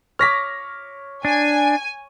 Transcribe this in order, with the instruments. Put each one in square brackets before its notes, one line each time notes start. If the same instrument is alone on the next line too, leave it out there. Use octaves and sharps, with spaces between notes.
[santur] C#5 D6 [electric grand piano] F6 A#6 B6
[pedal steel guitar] D4 [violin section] G#5